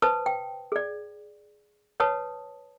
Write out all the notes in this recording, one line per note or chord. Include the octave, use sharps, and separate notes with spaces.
B4 C5 A5 D#6
G5
G#4 D5
B4 C#5 F#5 A5 D#6